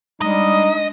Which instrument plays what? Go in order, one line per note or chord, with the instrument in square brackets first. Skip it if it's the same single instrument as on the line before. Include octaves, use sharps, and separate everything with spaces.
[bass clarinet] G3 [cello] G#3 D4 [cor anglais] D#4 [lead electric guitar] D#5